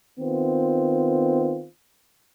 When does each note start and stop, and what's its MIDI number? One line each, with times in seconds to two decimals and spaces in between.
0.19 1.67 51
0.19 1.67 59
0.19 1.67 60
0.19 1.67 65